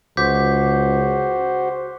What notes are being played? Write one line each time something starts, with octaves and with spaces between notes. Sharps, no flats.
C#2 F#4 C5 D6 G6 B6